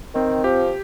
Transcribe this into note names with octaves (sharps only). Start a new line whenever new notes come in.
D#3 C4
F3 G4